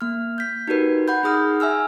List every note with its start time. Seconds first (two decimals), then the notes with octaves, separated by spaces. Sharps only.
0.01 A#3 F6
0.38 G6 B6
0.68 D#4 F#4 G4 A#4 B4
1.08 F#5 B5 G6
1.23 D#4 G#4 D#6 F6
1.60 E5 G#5 E6 F6